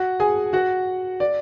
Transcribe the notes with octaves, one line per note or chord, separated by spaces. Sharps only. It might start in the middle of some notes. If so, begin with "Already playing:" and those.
Already playing: F#4 F#5
G#4 G#5
F#4 F#5
D5